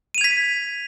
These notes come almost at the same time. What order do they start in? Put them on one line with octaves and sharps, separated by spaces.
D#7 F7 G#6 B6